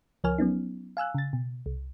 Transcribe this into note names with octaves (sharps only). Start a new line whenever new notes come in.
C#2 F3 A#4 C#5 G#5 F6
F#3 B3 C#4 D#4
F5 G#5 E6 F#6
C#3 A6
B2
C2